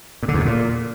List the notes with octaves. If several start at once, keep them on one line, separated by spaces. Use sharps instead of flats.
A#2
D3
E2
A2
A#2